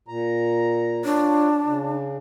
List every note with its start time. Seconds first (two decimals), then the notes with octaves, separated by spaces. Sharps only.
0.08 A#2 A#5
1.04 D4 F4 C#5
1.65 C#3